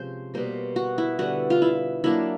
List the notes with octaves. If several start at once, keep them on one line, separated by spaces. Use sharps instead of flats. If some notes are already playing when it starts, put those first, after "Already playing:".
Already playing: C3 F3 G#3 C#4 C5
B2 G3 A#3 C5
F#4
E4
D3 G3 B3 D4 F#4
F4
E4
F#3 A#3 D4 E4